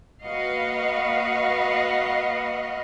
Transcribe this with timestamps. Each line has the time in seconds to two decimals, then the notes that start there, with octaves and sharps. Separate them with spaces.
0.24 A#3 F#4 B4 D#5 F5